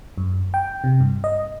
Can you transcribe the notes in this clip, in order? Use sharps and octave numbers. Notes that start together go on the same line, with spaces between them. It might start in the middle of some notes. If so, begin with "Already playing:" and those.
F#2
G5
C3
G2
D#5